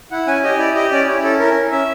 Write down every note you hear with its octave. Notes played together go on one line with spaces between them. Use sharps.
E4 F#5
C#4 G#5
G4 D#5
E4 D5
G4 D#5
C#4 D5
E4 C#5
C#4 A4
E4 A#4
C#4
C#4 E5